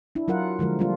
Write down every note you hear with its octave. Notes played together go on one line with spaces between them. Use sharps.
D4 E4
F#3 F4 A#4 F#5
D3 F3 G#3 A#4
G3 A#3 D4 F4